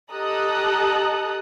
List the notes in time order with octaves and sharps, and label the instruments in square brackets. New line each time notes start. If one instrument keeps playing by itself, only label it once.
[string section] G4 A4 D#5 A#5 D#6 F#6